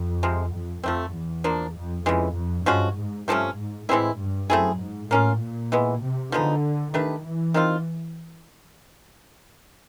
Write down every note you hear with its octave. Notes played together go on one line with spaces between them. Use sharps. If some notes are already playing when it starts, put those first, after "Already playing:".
Already playing: F2
C3 F3 G#3
F2
F2 F3 A3 C4
E2
F3 A#3 D4
F2
F2 C#3 E3 G#3
F2
G2 F3 G#3 C#4 F#4
G#2
G2 C3 F3 A3 C#4
G#2
A2 E3 G#3 C4 E4
G2
F#2 A3 C4 E4 G#4
G#2
A2 A#3 C#4 F4
A#2
E3 G#3 B3
C3
D3 F3 G#3 B3 D#4
D#3 A3 D4 G4 B4
E3
D#3 G3 C4 F4